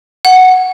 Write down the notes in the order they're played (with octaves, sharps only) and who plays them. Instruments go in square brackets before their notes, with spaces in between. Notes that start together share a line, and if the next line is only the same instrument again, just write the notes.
[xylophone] F#5